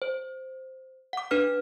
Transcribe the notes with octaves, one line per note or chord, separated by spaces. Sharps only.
C5
F#5 D6
D4 B4 F6